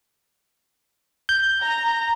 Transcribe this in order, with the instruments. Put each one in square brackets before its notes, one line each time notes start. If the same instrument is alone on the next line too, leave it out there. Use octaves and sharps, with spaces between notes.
[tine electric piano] G6
[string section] A#5